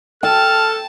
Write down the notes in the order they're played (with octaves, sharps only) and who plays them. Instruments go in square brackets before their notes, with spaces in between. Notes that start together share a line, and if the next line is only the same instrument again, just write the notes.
[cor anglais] A4 [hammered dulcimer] G5 [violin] A5 [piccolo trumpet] F6